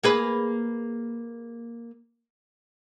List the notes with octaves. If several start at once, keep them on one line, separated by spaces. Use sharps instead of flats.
A#3 G#4 B4